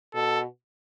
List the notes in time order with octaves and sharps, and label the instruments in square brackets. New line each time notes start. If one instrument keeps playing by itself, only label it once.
[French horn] B2 [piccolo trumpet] A4